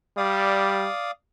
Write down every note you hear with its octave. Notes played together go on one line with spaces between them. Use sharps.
G3 D5 F5 D#6